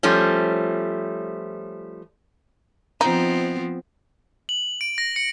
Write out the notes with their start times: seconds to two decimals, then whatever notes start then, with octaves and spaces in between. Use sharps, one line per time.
0.03 F3 G3 A3 C#4
3.01 F3 B3 C4 D#4
4.49 F#7
4.81 D7
4.98 A#6
5.16 C#7